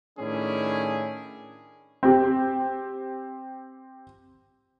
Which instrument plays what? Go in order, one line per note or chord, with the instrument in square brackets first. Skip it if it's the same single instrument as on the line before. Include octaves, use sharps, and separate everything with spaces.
[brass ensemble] A2 D#3 C#4 D4 E4 G#4
[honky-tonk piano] C4 G4